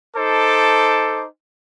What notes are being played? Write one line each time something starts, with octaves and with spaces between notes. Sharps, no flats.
D#4 A4 C5 A5 D6